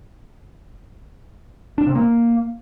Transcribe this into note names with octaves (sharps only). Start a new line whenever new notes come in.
D4
C3
A#3